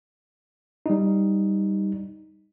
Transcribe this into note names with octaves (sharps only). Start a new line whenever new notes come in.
G3 D#4